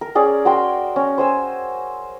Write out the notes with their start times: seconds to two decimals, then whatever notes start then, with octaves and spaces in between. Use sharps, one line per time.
0.01 A#4
0.15 C#4 G#4 D5
0.45 F#4 A#4 G5 C6
0.96 C#4
1.18 C5 G#5 E6